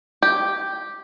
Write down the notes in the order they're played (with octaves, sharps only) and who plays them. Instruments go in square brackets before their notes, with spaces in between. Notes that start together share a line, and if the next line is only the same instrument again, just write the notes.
[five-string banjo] G4